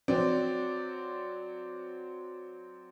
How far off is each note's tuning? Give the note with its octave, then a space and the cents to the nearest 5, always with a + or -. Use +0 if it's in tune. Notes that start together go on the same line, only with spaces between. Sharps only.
F#3 -15 C4 -10 D5 -5